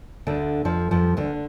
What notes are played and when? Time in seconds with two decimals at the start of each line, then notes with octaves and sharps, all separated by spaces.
0.27 D2 D3
0.65 F2 F3
0.91 F2 F3
1.17 D2 D3